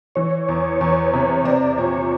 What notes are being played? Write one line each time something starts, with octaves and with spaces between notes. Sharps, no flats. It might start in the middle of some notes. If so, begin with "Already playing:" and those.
E3 C#5
E2
E2
C3
C4 D5
A#2 C#5